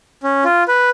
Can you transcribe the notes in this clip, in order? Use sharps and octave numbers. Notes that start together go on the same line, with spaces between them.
C#4
F4
B4